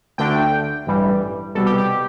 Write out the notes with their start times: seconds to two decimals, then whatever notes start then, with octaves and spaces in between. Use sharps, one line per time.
0.18 D2 D3 A3 D4 G5
0.87 A1 G2 E3 G3
1.55 C2 B2 G3 A4
1.66 G4
1.78 G4